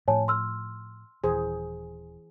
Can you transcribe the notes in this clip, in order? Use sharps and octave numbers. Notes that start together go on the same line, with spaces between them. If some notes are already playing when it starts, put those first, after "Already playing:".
A2 F3 C#5 G#5 A5
C6 E6 F6
D#1 E3 G#4 C5